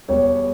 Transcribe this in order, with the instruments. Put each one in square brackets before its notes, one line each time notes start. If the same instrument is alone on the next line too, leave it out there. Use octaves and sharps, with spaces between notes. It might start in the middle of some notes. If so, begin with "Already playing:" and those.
[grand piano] E1 E2 B2 G3 [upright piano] C#5